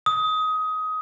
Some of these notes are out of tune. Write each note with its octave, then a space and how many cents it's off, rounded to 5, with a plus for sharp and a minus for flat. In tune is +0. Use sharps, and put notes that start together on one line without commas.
D#6 +20